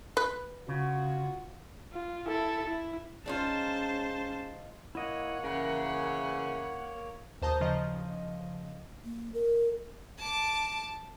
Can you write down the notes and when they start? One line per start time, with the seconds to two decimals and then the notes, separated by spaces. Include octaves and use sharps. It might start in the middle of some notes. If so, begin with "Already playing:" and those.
0.17 B4
0.68 C#3 F4 F#4
1.93 F4
2.27 E4 A4
2.66 E4
3.26 G#3 C#4 D#4 F4 C5 A5
4.95 A#3 E4 C#5 D#5 F#5
5.44 C#3 E3 A#4
7.42 D#2 C5 A5 A#5 D#6 G6
7.61 C#3 F3 D#5
9.04 A#3
9.34 A#4
10.19 A5 D6